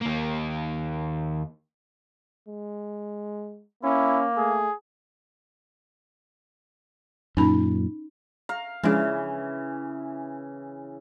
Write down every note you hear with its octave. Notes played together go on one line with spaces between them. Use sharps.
D#2 A#3
G#3
A#3 C#4 E4
A3 G#4
F#2 A#2 C#4 D#4 B5
F5 A#5
C#3 E3 F3 G#3 D4